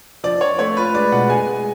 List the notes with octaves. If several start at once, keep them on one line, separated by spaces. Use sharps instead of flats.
F3 D5
F3 C#5
A3 C#5
F4 B4
G#3 D5
B2 F#5
G#3 G#5
G#3